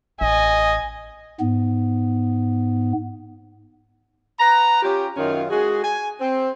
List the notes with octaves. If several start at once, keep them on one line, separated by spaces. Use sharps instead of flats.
A1 D#5 G#5
G#2 B3
B4 F#5 A#5
C#4 F4 G4
F#2 D#3 C#4 F4
G#3 F#4 G#4
G#5
C4